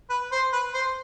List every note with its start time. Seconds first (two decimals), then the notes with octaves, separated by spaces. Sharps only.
0.10 B4
0.32 C5
0.53 B4
0.74 C5